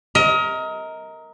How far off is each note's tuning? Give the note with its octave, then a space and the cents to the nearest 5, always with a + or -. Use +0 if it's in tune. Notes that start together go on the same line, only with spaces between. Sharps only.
A#4 +0 D#5 +30